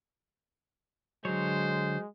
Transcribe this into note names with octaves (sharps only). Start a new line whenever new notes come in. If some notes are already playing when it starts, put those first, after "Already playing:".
D3 F#3 G#3 C5 C#5